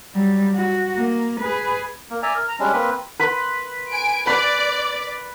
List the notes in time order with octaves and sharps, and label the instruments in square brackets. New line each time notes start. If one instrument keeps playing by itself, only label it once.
[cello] F#3 G3
F#4
A#3
G#4 B4
[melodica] A#3
D5 E5 G#5 A#5
A#4
A#5
G3 G#3 C#4 D4
A#3 C4 B4 B5
[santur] B4 B5 C6
[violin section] G#5 D7
[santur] B4 [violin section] D5